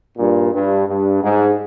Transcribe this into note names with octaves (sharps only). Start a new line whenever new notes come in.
G2 A#2
G2
G2
G#2